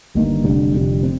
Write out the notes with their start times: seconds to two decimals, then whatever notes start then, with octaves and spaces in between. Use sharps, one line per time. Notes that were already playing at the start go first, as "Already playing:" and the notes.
0.14 G1 G2 D#3 A#3
0.44 F1 F2 D3 G3
0.73 F1 F2 D3 G3
1.03 C4